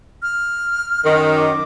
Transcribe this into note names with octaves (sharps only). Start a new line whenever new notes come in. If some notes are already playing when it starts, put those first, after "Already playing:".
F6
F#2 D#3
D6